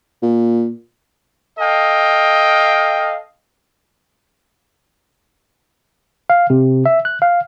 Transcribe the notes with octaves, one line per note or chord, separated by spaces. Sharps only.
A#2
A4 D#5 F5 G5
F5
C3
E5
F#6
F5